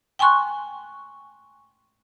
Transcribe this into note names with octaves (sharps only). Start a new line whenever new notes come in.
G5 G#5 C6 C#6 F#6